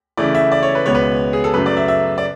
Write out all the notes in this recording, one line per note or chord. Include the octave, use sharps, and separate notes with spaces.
C#3 E3 A3 E4 D5
E5
D5
C#5
B4
C#2 B2 G#3 B3 C#5
B4
G#4
A4
F#2 C#3 F#3 A3 B4
D5
E5
E5
D5